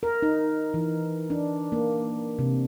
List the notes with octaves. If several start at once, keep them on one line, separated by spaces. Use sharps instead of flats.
A#4
D#4
E3
D4
A#3
C3